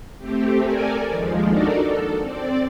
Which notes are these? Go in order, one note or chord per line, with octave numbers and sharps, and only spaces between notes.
A3 C4 G4
A4 A#4 D5 G#5
D#2 F3 G#3
D4 D#4 F#4 A4 A#4 D5
A4
C4 D5